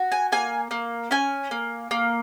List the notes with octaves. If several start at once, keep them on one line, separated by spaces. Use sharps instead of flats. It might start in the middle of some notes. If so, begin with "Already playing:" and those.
Already playing: F#4
G#5
A#3 G#5
A#3
C#4 G#5
A#3
A#3